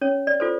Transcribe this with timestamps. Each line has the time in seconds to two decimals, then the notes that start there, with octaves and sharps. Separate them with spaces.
0.01 C#4 C#5
0.27 D5
0.40 F4 A4 C5